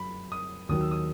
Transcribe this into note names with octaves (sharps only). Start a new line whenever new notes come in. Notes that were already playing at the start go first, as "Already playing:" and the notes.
Already playing: F#2 B5
D#6
D#2 D#3 F#3 D#6
E6
D#6